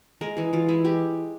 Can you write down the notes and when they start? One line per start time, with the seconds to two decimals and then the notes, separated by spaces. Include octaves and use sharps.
0.21 G#3 A#4
0.37 E3 G#4
0.53 E3 F4
0.68 G#3 E4
0.85 G#3 G4